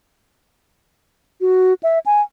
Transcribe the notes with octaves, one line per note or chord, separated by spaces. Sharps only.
F#4
E5
G#5